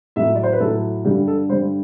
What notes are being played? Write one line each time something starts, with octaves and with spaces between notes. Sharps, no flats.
A2 F#3 E5
D5
C5
B4
A2 F#3 A4
G2 D3 G3 G4
A4
G2 D3 G3 C5